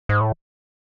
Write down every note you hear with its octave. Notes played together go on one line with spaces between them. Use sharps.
G#2
A2